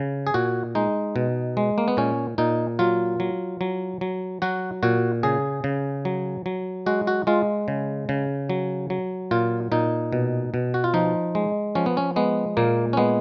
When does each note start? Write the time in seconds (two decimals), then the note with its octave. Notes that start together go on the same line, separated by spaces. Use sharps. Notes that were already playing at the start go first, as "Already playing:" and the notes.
Already playing: C#3
0.27 G#4
0.34 A#2 F#4
0.75 G#3 D#4
1.16 B2
1.57 G#3
1.78 A#3
1.88 B3
1.97 A#2 C#4
2.38 A#2 D#4
2.79 F#3 F4
3.20 F#3
3.61 F#3
4.01 F#3
4.42 F#3 F#4
4.83 A#2 F#4
5.23 C#3 G#4
5.64 C#3
6.05 F#3
6.46 F#3
6.86 G#3 F#4
7.07 F#4
7.27 G#3 F4
7.68 C#3
8.09 C#3
8.50 F#3
8.90 F#3
9.31 A#2 F4
9.72 A#2 D#4
10.13 B2
10.54 B2
10.74 F#4
10.84 F4
10.94 F3 D#4
11.35 G#3
11.75 F3 C#4
11.86 B3
11.97 C#4
12.16 G#3 B3
12.57 A#2 A#3
12.93 C#4
12.97 G#3 B3